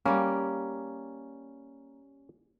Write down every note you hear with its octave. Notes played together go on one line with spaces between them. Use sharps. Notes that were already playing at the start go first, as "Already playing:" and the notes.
G3 A#3 C#4